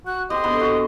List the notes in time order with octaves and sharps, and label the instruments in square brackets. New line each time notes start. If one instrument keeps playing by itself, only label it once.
[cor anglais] F#4 [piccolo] F#6
[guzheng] C4 [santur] G4 [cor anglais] D#5 [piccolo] C6
[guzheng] G#2 D3 [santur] B3
[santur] F#4